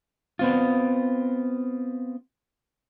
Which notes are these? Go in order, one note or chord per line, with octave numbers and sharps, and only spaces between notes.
B3 C4 F4